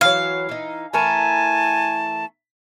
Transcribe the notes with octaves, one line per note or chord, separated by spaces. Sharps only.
E3 F#3 F5
E3 D#4
E3 A3 A#4 G#5 A5